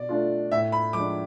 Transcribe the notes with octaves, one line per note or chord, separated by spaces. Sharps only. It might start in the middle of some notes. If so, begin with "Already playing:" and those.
Already playing: B2 D5
A3 D4 F4
A2 E5
B5
F3 G#3 D4 D6